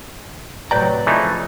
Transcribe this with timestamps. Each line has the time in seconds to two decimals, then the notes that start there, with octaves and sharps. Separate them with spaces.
0.71 A2 C3 F#3 B4 D5 G5 A#5
1.06 C#3 E3 F3 A3 D#4